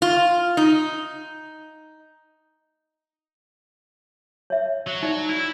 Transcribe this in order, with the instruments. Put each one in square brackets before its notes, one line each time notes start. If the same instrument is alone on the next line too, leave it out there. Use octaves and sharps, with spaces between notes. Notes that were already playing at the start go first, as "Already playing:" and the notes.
[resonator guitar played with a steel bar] F4
D#4
[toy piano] C#5 E5
[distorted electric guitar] F#3
[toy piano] D#4 D5
[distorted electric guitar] E4